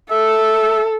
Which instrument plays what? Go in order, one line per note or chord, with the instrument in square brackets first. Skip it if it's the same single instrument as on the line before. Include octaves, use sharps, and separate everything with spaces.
[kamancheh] A4 [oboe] E5